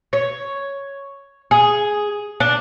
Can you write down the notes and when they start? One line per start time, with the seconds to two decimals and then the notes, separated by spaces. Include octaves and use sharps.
0.13 C#5
1.51 G#4
2.40 D4